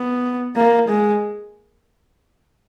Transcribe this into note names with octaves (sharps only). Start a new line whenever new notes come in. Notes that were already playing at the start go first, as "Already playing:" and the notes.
Already playing: B3
A#3
G#3